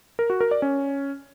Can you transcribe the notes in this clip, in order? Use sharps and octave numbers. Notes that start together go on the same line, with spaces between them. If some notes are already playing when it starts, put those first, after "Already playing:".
A#4
F#4
A#4
D5
C#4